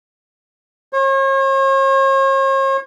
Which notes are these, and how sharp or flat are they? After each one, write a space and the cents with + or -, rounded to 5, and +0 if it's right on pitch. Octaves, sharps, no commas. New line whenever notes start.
C#5 -45